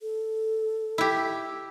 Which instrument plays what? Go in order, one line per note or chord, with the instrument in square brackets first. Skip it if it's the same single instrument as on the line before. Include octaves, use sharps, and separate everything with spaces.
[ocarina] A4
[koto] E4 G4